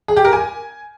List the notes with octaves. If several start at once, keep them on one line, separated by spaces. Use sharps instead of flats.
G#4
G4
A#4
G#5